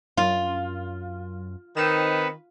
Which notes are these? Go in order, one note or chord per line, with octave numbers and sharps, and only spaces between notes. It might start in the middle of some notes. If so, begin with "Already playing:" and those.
F#2 F4
D#3 C4 D#4 B4 C#7 E7